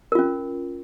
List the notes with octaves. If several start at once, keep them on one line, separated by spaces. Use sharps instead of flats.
C#4 F4 A#4